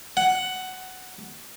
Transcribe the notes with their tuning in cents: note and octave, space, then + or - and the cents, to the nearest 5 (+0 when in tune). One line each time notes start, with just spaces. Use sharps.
F#5 +10